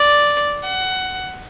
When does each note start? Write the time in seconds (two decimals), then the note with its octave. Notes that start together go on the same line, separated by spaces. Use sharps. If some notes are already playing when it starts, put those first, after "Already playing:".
Already playing: D5
0.64 F#5